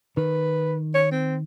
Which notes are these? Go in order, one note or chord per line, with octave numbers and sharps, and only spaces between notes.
D#3 B4
C#5
C4